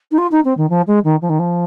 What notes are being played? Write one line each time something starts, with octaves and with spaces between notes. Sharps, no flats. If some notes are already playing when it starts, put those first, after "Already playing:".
D#4
F4
D#4
C4
D#3
F3
G#3
D#3
F3
D#3
F3